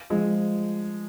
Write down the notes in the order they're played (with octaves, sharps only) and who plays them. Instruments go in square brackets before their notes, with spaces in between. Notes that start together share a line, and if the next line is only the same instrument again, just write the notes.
[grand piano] F3 G#3